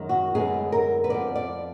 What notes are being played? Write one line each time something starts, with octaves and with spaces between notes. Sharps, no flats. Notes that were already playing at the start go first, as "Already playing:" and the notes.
Already playing: F#2 D#3 G#3
F#4
F#2 D3 G#3 B3 G#4
A#4
B4
F2 F3 B3 D5
D5